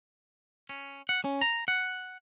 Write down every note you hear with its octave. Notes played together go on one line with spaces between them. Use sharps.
C#4
F#5
C#4
A#5
F#5